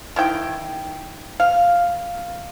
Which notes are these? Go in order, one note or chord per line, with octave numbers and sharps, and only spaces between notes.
D#3 E4 G5
F5